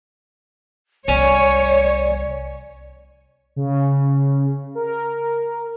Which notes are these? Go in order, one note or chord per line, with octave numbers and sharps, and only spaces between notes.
C2 C#4 C#5 D5
C#3
A#4